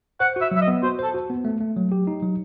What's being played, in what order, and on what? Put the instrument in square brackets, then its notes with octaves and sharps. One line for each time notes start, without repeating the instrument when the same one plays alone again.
[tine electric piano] C5 [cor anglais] F#5
[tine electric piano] F#4
[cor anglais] E5
[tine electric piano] F#3
[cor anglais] E5
D#5
[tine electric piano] B3
[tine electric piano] F#4 [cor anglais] C5
[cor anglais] A4 [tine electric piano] C5
[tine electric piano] F#4
B3
A3
A3
F#3
G4
D#4
F#3